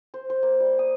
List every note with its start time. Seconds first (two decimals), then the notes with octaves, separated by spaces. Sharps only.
0.14 C5
0.30 C5
0.43 A#3
0.60 G3
0.79 D#6